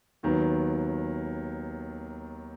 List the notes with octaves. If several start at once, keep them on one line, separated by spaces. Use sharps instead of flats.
D#2 D#3 F#3 B3